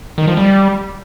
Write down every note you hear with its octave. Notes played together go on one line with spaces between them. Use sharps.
D#3
F3
G3